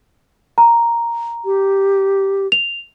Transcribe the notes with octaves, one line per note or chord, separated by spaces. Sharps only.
A#5
G4
F7